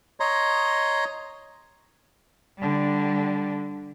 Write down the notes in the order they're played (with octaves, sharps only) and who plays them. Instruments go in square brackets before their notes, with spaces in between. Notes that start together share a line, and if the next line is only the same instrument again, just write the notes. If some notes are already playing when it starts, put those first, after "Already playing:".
[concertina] C#5 D#5 A#5 C6
[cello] D3 G3